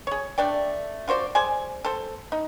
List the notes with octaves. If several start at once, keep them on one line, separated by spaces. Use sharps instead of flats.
G#4 C#5
A3 D4 D5 G5
F4 F#4 C5 D5
G#4 C5 D5 G#5
A4 C5
D#4